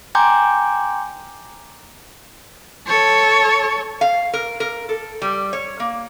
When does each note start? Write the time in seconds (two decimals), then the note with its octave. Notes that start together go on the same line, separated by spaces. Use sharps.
0.15 G5 G#5 A#5 C6 D6 G6
2.87 A4 C#5
4.01 F5
4.33 A#4
4.60 A#4
4.89 A4
5.22 G3
5.53 C#5
5.80 A#3